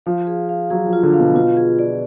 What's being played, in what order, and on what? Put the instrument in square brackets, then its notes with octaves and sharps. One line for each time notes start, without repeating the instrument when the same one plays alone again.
[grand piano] F3 [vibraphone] F5
[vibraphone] G#4
F5
[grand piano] F#3 [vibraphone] G#4
[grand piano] F3
[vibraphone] F4
[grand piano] D3
[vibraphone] F5
[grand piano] B2
[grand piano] B2 [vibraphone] F4
[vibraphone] G#4
D5